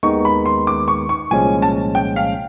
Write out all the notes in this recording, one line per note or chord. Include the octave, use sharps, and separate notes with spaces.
D#2 D#3 G#3 B3 D#4 C#6
B5
C6
D6
C#6
C#6
C2 A#2 F3 G#3 C#4 G#5
A5
G5
F5